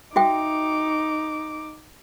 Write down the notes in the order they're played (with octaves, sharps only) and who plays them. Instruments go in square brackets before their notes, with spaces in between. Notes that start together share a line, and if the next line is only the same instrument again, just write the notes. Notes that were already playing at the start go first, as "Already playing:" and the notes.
[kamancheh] D#4 D6 [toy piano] F#4 E5 G5